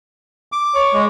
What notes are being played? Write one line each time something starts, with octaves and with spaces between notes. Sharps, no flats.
D6
C#5
G#3